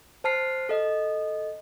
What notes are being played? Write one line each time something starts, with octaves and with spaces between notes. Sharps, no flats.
C5 A5 F6 C7
A4 D#5